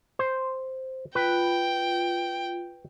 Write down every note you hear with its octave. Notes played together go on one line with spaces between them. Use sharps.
C5
F4 B4 G5